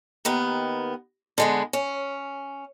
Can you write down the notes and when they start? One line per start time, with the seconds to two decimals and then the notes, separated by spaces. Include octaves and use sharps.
0.25 D#2 D#3 B3
1.38 D3 G#3 B3
1.73 C#4